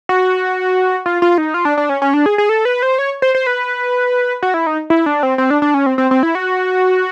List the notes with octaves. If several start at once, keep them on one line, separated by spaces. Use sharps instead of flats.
F#4
F4
F4
D#4
F4
D4
D4
C#4
C#4
D4
G#4
G#4
A4
B4
C5
C#5
C5
C5
B4
F#4
E4
D#4
E4
D4
C4
C4
D4
D4
C#4
C4
C4
C4
E4
F#4